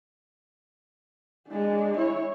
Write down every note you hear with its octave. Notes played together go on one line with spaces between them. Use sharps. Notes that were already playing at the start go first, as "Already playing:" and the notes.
G#3 D4
E4 C#5